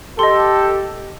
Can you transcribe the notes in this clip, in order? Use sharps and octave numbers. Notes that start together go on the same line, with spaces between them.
G4 A4 D#5 C6